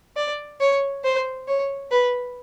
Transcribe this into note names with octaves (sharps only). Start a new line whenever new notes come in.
D5
C#5
C5
C#5
B4